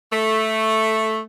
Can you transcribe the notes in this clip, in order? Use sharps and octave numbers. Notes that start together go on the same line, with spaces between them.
A3